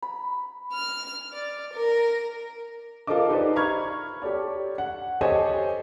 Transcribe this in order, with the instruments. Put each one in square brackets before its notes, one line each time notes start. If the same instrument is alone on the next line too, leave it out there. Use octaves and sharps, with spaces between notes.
[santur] B5
[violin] F6
D5
A#4
[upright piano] F4 A4 A#4 C5 D#5 D6
D#4 G4 B4 C5 D5 D#5
A#5 B5 C#6 F6 G#6
G4 A4 C#5 D5
F#5
G4 A4 C5 C#5 D#5 G#5